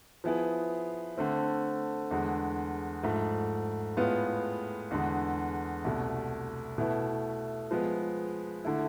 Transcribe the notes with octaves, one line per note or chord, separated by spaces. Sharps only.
F3 B3 E4 G#4 B4
D3 A3 C4
E2 D3 G#3
G#2 F3 A3
A2 G#3 B3 F4
E2 D3 G#3
C2 B2 A3
B2 A3 E4 B4
F3 G#3 B3
D3 A3 E4